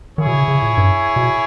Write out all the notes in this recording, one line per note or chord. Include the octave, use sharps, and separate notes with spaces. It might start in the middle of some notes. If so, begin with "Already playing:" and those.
D#3 E4 G#4 C#5
B2
C#3
C#3
A#2
G2
B2